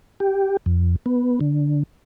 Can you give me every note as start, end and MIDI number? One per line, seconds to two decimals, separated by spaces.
0.20 0.57 67
0.66 0.96 41
1.06 1.39 59
1.41 1.83 50